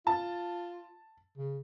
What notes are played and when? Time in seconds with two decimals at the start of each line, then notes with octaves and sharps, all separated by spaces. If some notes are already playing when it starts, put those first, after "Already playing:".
0.07 F4 A5
1.38 C#3